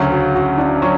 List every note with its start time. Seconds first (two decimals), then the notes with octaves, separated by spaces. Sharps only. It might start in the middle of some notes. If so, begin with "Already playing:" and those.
Already playing: D2 C#3 F#3 C#4 F#4
0.12 F#4
0.35 F#4
0.58 D4
0.82 F#3 C#4